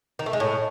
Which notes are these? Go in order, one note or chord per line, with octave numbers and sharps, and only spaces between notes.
D#3
A3
G#3
A2